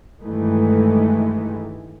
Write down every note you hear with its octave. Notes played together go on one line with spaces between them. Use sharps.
G2 D#3 E3 G#3 A3